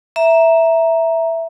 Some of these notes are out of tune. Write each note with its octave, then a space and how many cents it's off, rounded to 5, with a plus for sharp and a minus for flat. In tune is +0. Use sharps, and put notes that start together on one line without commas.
E5 +0 A#5 +0